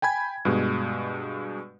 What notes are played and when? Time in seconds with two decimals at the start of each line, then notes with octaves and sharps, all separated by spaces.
0.02 G5 G#5 B5 G#6
0.45 G2 B2 G#3